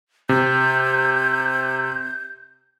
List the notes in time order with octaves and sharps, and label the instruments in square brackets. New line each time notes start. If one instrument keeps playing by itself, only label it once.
[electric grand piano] C3 [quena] G6